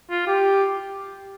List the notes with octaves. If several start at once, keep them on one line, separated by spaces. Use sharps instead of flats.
F4
G4